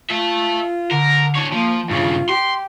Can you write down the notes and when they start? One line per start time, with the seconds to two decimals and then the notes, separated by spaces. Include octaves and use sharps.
0.10 F4 A4 E5
0.91 D3 A#4
1.36 D4 C#5
1.52 F3 A#3
1.90 G2 C#3 F4
2.29 G4 C6